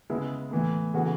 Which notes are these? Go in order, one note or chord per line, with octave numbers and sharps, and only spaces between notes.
C#3 G#3 B3 E4
A2 E3 B3 E4
C#3 E3 B3 F#4 A4